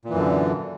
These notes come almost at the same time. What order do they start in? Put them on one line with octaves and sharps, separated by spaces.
A#2 E3 F#2 D3